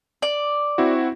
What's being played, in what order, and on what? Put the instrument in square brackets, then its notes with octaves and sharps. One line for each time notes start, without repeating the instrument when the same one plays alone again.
[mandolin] D5
[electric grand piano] C4 E4 F#4